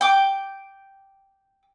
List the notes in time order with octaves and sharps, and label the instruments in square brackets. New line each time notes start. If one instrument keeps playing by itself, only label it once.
[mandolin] G5 D6